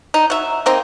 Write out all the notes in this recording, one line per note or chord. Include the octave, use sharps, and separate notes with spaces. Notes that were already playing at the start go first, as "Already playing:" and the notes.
D#4
F#3 E5
A#3 C4 D#4